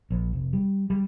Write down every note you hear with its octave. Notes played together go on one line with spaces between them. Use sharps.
A#1
F1
G3
G3